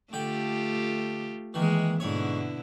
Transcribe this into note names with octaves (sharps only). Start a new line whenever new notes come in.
D3 A3 F4 G4 G5
D#3 E3 G#3 A#3
G#2 B2 D3 E4 C#5